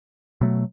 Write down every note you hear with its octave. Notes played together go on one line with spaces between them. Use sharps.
B2 F#3 A3